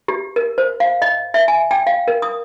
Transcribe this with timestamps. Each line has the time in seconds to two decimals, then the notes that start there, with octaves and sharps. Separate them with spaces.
0.08 G4
0.36 A#4
0.58 C5
0.80 F5
1.02 D#5
1.34 E5
1.48 G#5
1.71 G5
1.87 F5
2.08 A#4
2.22 D#6